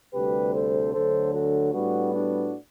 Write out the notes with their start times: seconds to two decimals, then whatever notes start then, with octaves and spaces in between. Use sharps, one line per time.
0.14 D2 C3 G3 G4 B4
0.54 A4 C5
0.94 D2 D3 F#3 A4 C5
1.33 F#4 A4
1.73 A2 G3 B3 D4 F#4
2.14 D4 F#4